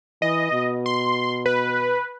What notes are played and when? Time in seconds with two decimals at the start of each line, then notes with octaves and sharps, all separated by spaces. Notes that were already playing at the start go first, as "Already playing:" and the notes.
0.22 E3 D#5
0.53 B2
0.86 C6
1.46 B4